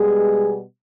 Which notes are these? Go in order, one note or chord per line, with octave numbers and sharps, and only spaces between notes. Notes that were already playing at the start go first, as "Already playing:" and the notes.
Already playing: B2 G3 G#3 B3 G#4